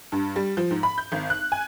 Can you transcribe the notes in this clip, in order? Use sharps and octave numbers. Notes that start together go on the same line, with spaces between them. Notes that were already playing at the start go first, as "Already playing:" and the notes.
G2
G3
F3
G#2
B5
G6
G#1
F#6
G#5